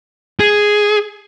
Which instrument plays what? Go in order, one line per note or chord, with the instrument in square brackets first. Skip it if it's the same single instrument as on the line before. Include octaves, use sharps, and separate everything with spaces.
[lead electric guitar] G#4